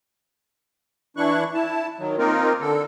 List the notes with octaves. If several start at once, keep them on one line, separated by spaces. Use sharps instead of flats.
E3 D4 E4 C#6 F#6
E4 A5
D#3 F#3
A#3 C4 D#4 F4 A#4
D3 A4